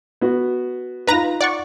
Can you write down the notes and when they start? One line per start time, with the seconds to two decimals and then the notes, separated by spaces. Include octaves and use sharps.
0.21 B3 F#4
1.07 D#4 F4 B4 A#5 A#6
1.41 D5 F#5 C#6